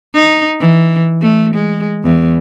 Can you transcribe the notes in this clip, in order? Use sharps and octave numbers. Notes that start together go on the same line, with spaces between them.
D#4
E3
A3
G#3
E2